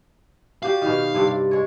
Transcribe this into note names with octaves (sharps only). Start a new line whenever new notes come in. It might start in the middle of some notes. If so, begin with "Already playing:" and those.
F#4 G4 D5 F5
B2 D#3
G2 C3 D5
G#3 C#5